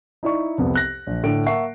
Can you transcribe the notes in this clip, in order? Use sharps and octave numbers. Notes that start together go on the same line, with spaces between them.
D#4 E4 D5 C#6
C2 F2 B3
F#6 A#6
A#1
A2 D3 D7
A#3 E5 F#5 A5 C#6 C7